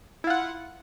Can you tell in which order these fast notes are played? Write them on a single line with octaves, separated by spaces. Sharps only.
E4 F4 F#5